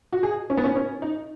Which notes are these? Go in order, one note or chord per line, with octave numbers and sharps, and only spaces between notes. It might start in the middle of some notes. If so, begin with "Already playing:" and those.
F#4
G#4
C#4
B3
C#4
C#4
D#4